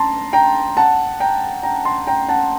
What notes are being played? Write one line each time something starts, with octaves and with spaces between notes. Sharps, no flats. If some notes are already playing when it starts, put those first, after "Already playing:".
Already playing: A5 A#5 C6
G5 A#5
F#5 A5
G5 A#5
G5 A#5
A5 C6
G5 A#5
F#5 A5